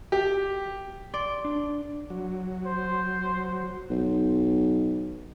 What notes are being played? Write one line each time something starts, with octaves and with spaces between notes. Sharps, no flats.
G4
D5 C6
D4
F#3
C5
B1